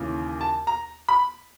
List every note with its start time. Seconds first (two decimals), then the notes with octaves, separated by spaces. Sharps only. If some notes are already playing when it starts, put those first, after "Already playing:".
Already playing: D#2 C#3 E3
0.41 A5
0.67 A#5
1.09 B5